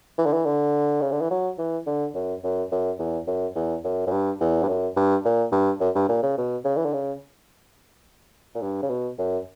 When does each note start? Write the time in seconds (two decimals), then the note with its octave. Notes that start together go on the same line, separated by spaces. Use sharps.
0.18 E3
0.26 D3
0.33 E3
0.46 D3
1.01 C#3
1.12 D3
1.21 E3
1.31 F#3
1.58 E3
1.86 D3
2.15 F#2
2.44 F#2
2.72 F#2
2.99 E2
3.27 F#2
3.56 E2
3.84 F#2
4.07 F#2
4.12 G2
4.40 E2
4.63 G2
4.68 F#2
4.97 G2
5.25 A#2
5.52 G2
5.80 F#2
5.95 G2
6.09 A#2
6.23 C#3
6.38 B2
6.65 C#3
6.77 E3
6.85 D3
6.93 C#3
8.55 A#2
8.62 G2
8.83 C#3
8.90 B2
9.19 F#2